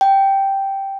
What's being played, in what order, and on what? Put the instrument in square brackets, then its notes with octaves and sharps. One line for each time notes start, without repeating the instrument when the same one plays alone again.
[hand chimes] G5